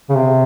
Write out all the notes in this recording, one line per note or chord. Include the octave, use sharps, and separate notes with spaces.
C#3
C3